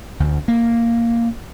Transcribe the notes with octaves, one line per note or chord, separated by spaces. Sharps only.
D2
A#3